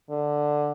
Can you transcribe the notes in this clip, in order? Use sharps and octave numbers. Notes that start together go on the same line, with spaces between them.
D3